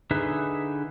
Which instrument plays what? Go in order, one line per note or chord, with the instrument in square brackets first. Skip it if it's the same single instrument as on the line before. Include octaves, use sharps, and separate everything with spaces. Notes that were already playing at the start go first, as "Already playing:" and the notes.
[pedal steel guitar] D3 D#4 G#4 B4 E5